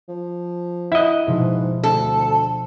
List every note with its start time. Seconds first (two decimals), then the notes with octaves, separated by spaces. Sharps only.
0.09 F3
0.92 E4 D#5 F#5 F#6
1.27 G#2 B2 F3
1.83 D2 A4